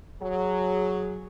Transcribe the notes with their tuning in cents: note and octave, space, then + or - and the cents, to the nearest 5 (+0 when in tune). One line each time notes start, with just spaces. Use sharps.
F#3 +0 G#4 +0